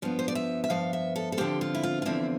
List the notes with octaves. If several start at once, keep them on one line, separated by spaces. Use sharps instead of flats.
G2 F3 B3
C5
D5
E5
E5
G2 F3 B3 F5
E5
A4
A4
E2 D3 F3 C4 G4
F4
E4
F4
F4
E2 D3 F3 C4 E4